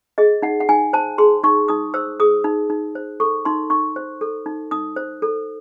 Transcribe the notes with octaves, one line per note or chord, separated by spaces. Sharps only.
G#4 D#5
D#4 F#5
F#5
D#4 G#5
C5 A5
G#4 C6
D#4 C#6
D#4 D#6
C5 E6
G#4 D#6
D#4
D#4
C5
A4 C#6
D#4 C6
D#4 C#6
C5
A4
D#4
D#4 D#6
C5
A4